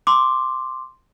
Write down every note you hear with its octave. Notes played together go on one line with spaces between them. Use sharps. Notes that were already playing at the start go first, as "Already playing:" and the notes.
C6 D6